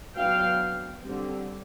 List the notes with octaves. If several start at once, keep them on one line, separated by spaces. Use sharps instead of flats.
F#3 B3 D4 F5 G5
D3 G3 C4